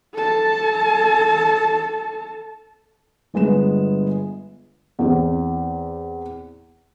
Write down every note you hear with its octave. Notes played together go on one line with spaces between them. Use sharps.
A4 A5
G1 G#3 B3 E7
E2 C4